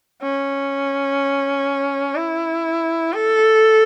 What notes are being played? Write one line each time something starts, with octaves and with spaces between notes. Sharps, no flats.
C#4
E4
A4